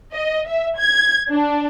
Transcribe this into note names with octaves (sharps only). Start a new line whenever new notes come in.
D#5
E5
G#6
D4